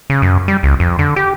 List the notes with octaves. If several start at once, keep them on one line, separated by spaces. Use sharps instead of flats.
C#3
F#2
G3
C#2
F2
D3
G4